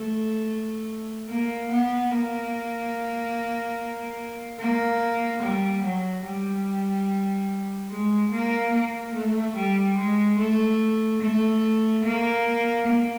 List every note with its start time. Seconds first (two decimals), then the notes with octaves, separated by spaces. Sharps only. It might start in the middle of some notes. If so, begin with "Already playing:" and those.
Already playing: A3
1.29 A#3
1.70 B3
2.11 A#3
4.59 A#3
5.42 G3
5.83 F#3
6.24 G3
7.90 G#3
8.31 A#3
8.73 A#3
9.14 A3
9.56 G3
9.97 G#3
10.38 A3
11.21 A3
12.03 A#3
12.86 A#3